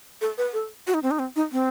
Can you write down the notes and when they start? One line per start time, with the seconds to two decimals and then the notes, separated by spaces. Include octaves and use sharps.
0.21 A4
0.38 B4
0.53 A4
0.87 F#4
0.94 D#4
1.03 C4
1.11 D#4
1.19 C4
1.36 D#4
1.52 C4